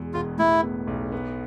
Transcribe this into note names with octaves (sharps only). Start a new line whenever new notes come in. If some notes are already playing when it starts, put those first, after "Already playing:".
Already playing: E2 B2 G#3
E1 F4
A2 E4
B3
B1
B3